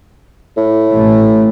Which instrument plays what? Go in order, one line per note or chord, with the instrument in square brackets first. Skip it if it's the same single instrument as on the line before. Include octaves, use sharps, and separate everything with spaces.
[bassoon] A2
[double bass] A1 A3